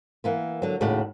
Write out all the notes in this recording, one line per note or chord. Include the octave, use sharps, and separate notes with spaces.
E3 A#3 B3
D3 F#3
D#2 A2 C#3 F#4 D5 F#5